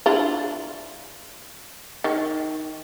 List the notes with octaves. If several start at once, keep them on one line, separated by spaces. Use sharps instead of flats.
D4 E4 F4
D#3